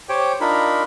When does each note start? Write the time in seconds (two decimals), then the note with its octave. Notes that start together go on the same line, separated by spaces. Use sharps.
0.09 G4 C5 C#5 G5
0.41 D4 D#4 F4 A#4 B5